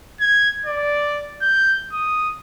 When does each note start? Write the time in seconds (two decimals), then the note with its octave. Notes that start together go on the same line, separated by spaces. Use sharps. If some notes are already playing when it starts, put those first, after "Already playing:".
0.20 G#6
0.66 D5
1.42 G6
1.93 D#6